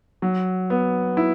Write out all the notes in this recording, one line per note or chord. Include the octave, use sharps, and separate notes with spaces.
F#3
B3
E4